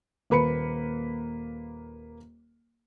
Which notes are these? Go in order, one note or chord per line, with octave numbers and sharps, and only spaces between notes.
D#1 A#3 B4 B5 C#7